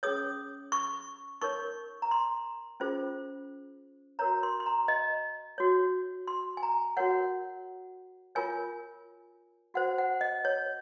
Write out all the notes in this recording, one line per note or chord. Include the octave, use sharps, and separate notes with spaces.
C#4 G#4 C#5 D#6
C#6
D#4 A#4 C#5 C#6
A#5
C6
C#4 F4 G#4 C5
F#4 A#4 C#5 A#5
C6
C6
A#5
D#5
F#4 C#5
C6
G#5
A#5
F#4 A#4 C#5 F#5
F4 A#4 C#5 G#5
F#4 C5 F#5
F#5
D#5
C#5